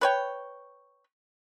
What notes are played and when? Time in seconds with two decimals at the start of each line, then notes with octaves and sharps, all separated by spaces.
0.01 B4 C#5 G5